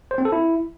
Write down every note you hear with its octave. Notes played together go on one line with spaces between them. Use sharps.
C5
C4
A4
E4